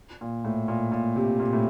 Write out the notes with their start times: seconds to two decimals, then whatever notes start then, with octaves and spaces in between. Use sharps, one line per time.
0.21 A#2
0.44 A2
0.68 A#2
0.92 A#2
1.16 C3
1.40 A#2
1.53 A2